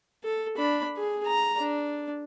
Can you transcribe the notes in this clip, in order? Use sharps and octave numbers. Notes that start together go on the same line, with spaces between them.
A4
D4 B5
G#4
A#5
D4